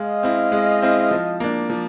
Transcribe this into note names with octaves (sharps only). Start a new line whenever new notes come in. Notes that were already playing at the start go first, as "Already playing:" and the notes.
Already playing: G#3 D#5 F5
C4 E4
G#3
C4 E4
F3
A#3 D4
F3